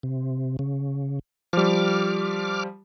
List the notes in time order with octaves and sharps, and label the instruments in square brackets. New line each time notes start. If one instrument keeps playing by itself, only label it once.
[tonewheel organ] C3
C#3
[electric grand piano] F3 G3 [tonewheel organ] D6 F6